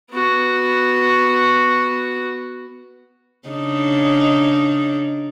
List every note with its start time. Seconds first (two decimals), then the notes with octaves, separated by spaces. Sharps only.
0.11 B3 F#4
3.49 C#3 D4 D#4